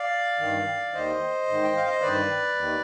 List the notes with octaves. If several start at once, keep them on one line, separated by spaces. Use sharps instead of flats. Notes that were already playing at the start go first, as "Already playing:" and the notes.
Already playing: D5 F5
G2 D#3
D#2 D#3 C5 D#5
G#2 D#3
G5
F5
D#5
G2 D#3 B4 D5
D#2 D#3